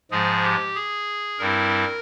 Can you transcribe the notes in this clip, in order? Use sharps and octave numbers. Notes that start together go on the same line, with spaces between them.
G#2 F3 G#3 G#4
G4
G#4
G2 G3 C4 E4 A#4